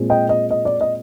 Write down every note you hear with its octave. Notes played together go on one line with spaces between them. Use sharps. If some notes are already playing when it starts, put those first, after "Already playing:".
Already playing: A#2 G#3 C4
D#5 G5
D#5
D#5
D5
D#5